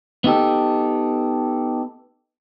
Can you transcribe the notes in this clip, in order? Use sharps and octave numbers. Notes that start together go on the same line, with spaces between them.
B3 D#4 G4 A4